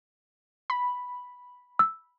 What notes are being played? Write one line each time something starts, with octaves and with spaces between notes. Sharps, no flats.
B5
E6